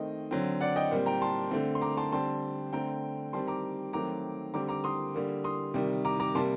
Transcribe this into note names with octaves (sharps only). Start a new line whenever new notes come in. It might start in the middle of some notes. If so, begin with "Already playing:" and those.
Already playing: D#3 A3 C4 D#5
D3 F#3 C4
D5 F#5
D#5 G5
A#2 G3 C4
G5 A#5
A5 C6
D3 A3 C4
C6
A#5 D6
A5 C6
D3 G3 C4 A5 C6
D3 A3 C4 G5 A#5
D#3 G3 C4 A5 C6
A#5 D6
D#3 F#3 A3 C4 A#5 D6
D3 G3 C4 A#5 D6
A#5 D6
C6 D#6
D3 G3 A#3
C6 D#6
C3 D#3 G3
A#5 D6
A#5 D6
C3 G3 A#3 A5 C6